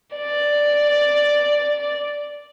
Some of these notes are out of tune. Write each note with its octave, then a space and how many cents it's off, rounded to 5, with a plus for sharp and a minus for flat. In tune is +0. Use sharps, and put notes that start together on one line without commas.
D5 +0